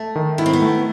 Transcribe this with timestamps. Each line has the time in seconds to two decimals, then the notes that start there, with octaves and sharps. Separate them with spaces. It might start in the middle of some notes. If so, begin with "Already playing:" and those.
Already playing: A3
0.16 D#3
0.38 B3 E4
0.46 C4
0.53 B3
0.62 A3